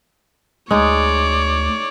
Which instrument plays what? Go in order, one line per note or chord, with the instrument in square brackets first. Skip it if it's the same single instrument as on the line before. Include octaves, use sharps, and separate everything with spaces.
[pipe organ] D2 [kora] G#3 D#4 [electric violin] C#5 D5